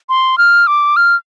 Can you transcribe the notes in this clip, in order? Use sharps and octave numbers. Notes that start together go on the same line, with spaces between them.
C6
F6
D6
F6